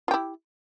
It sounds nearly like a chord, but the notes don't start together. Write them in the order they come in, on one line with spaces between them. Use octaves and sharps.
F4 G4 E4